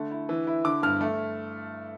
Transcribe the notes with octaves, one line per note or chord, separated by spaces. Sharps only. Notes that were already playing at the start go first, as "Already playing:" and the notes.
Already playing: D3 A3
E4
E3
E4
D3 D6
G2 F6
A3